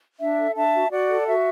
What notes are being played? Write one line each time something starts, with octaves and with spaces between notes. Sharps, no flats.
D4 E5
A4
D4 E5 A5
F#4
F#4 D5 F#5
A4
F#4 E5